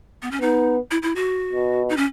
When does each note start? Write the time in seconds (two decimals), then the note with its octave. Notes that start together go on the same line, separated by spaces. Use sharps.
0.22 B3
0.31 C#4
0.41 B3 D#4
0.91 E4
1.02 E4
1.16 F#4
1.53 B2
1.89 D#4
1.97 C#4